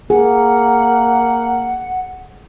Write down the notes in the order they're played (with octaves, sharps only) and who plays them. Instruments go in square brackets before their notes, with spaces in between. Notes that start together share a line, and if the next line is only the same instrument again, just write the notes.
[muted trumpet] A#3 [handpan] G#4 [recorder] F#5